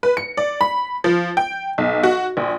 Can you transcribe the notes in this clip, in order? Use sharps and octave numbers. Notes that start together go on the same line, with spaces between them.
B4
C#7
D5
B5
F3
G5
B1
F#4
A#1